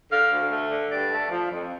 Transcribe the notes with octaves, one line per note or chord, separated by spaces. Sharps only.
D3 F5
D2
A3
D3
G2 D5
A3
F3
F2